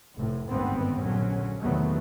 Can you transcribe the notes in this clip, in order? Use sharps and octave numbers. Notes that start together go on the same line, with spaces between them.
F1 A2 C3
G#1 D2 G2 D#3 B3 C4
A#1 D3 F#3 C#4
E2 C3 D#3 F#3 A3 B3